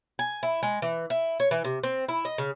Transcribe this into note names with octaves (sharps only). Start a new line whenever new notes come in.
G#5
E4
G#3
E3
E4
C#5
E3
C3
C4
E4
D#5
C#3